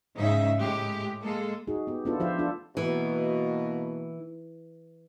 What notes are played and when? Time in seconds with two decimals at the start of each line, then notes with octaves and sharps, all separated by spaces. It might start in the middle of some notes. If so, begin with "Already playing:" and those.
0.16 G#2 C#3 C#4 D#4 E5
0.60 A2 G#3 G4
1.22 G#3 A#3 A4
1.67 D#4 F#4 G#4
1.87 B3 G4
2.05 A3 B3 D4 E4 F4 A4
2.20 F3 F4 G4 C5 E5 F5
2.39 D4 F4 A4
2.77 B2 E3 A#3